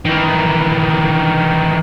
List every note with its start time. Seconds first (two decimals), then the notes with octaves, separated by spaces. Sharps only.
0.05 D#3 E3